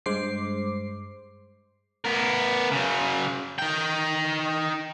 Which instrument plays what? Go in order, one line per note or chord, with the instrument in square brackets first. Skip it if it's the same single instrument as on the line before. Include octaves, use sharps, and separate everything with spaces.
[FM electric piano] G2 G#3 C5 D6 C7
[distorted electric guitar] B3 A#4
C#3 F#3
D#4 G5